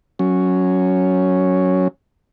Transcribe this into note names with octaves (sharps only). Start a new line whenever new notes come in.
F#3 C#4